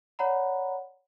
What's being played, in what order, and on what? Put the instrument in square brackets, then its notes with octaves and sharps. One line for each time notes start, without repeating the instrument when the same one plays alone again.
[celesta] C#5 D5 F#5 A#5 B5